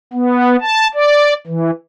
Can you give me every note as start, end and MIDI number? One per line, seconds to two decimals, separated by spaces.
0.13 0.56 59
0.61 0.88 81
0.94 1.33 74
1.47 1.71 52